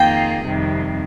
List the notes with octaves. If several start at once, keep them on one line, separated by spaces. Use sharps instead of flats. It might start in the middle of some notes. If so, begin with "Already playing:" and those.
Already playing: F2 D#3 A#3 F4 G#4 G5
F2 C3 D#3 G3